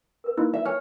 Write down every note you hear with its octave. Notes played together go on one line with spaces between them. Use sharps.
A#4 B4
A#3 D#4 E4
E5
C#5 G#5 F6